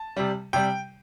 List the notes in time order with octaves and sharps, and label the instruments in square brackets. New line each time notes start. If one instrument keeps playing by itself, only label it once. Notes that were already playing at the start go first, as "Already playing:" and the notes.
Already playing: [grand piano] A5
C3 G3
C3 G3 G5